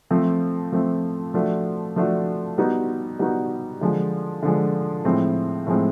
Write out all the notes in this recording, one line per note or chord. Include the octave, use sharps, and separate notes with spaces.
F3 A3 C4
F3 A3 C4
F3 A3 D4 F#4
F3 A3 D4 F#4
G3 B3 D#4 F#4
G3 B3 D#4 F#4
D3 F3 G#3
D3 F3 G#3
A2 F3 G#3 C4
A2 F3 G#3 C4